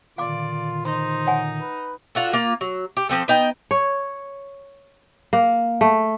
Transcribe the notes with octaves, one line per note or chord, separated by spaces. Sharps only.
A#2 D3 D#3 F4 D5 F5 D6
D#4 C5 C6
C#5 F#5 G#5
B4
D4 F4 F#4 A4
A#3 F4
F#3
G4
F3 C4 A4
B3 D#4 G5
C#5
A#3
A3